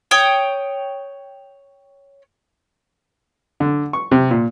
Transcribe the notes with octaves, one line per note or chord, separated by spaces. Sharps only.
C#5 G5 D#6
D3
C#6
C3
A#2